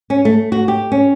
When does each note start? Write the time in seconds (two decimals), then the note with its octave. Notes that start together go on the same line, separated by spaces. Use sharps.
0.10 C#4
0.25 A3
0.52 F#4
0.68 G4
0.92 C#4